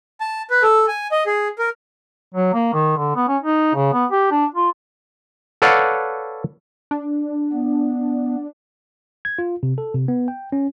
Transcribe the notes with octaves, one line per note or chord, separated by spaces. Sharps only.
A5
B4
A4
G#5
D#5
G#4
A#4
F#3
A#3
D#3
D3
B3
C#4
D#4
C#3
B3
G4
D4
F4
A4 B4 C#5 D5 F5 F#5
D4
B3
G#6
F4
C3
A4
C3
B3
G5
C#4